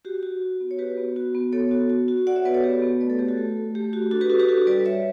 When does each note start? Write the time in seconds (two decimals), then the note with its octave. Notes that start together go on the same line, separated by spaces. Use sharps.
0.05 F#4 G4
0.23 F#4
0.42 F#4
0.60 B3
0.71 C#5
0.79 F#4 G4 B4
0.97 B3
1.16 F#4
1.35 B3
1.53 B3 A4 C#5
1.71 F#4
1.89 F#4
2.08 F#4
2.27 F#4 D5 F#5
2.36 C#5 E5
2.45 B3 B4 D5
2.54 A4 C#5
2.64 F#4 G4 B4
2.82 B3
3.01 A3 B4 D5
3.10 A4 C#5
3.19 A3 G4 B4
3.29 F#4 A4
3.37 A3
3.56 A3
3.75 A3 G4
3.93 F#4 G4
4.11 D4 F#4 A4
4.21 G4 B4
4.30 F#4 A4
4.39 G4 B4
4.48 F#4 A4
4.67 G3 B4 D5
4.86 G3 C#5 E5